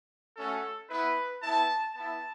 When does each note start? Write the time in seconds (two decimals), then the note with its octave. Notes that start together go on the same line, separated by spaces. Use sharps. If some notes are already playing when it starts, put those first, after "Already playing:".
0.37 A3 C#4 F#4 A4
0.89 B3 E4 B4
1.42 B3 E4 A5
1.94 B3 E4 A5